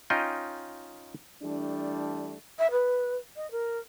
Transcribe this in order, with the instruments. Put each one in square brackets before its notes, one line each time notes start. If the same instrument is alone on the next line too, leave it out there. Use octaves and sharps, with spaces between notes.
[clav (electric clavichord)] C#4 D#4 F4 D#5 G5
[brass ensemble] E3 G3 A3 D4
[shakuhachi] E5
B4
D#5
A#4